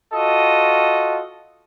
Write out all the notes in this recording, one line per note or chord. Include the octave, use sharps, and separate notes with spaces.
F4 F#4 A4 D#5